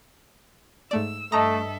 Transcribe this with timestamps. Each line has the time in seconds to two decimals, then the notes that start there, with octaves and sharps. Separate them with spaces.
0.91 G#2 A3 D5 E6
1.32 G2 A3 A4 D#5 E5 A5 A#5 D#6